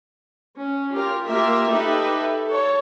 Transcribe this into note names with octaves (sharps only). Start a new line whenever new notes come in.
C#4
F4 G4 A#4
A#3 F4 G4 A#4 E5
D#4 G4 A4 B4 E5
A4 C#5